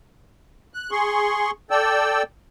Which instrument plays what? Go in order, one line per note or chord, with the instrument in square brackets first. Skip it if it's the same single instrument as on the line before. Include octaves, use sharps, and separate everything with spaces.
[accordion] F#6
G#4 C6 C#6
A4 D5 G5 E6